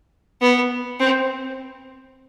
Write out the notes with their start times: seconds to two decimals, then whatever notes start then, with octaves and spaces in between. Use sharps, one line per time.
0.41 B3
1.00 C4